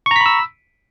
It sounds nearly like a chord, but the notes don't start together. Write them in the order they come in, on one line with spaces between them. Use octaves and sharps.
C#6 A#5 B6 B5 E6